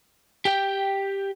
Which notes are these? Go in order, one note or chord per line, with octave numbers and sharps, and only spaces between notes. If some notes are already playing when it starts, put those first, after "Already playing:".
G4 G5